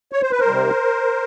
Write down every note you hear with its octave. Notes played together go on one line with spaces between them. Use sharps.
C#5
C5
B4
A#4 C5
C3 D#3 G3